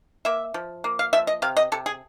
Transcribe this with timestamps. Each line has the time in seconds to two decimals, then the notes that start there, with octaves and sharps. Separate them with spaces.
0.25 A#3 E5
0.54 F3
0.84 A#3
0.99 F5
1.13 F3 E5
1.27 D#5
1.42 C3 F5
1.57 D#5
1.72 C3 A4
1.86 G#4